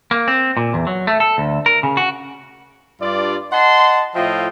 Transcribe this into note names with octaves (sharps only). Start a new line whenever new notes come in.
A#3
C4
A#2
E2
F#3
A3
A4
D2
A#4
C#3
F#4
G2 F4 D5
D#5 F#5 A5 C6
A2 F3 F4 D#5 E5 G5